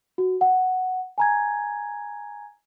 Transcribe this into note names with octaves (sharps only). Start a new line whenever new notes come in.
F#4
F#5
G#5 A#5 G#6